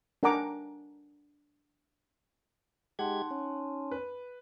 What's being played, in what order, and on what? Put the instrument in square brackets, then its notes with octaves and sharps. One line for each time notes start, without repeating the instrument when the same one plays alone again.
[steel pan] D4 A#4 F#5 G#5 A#5 D6
[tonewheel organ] G#3 G4 G#6 [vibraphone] D#4 A5 C6 [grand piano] F#5
[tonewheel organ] C#4
[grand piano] B4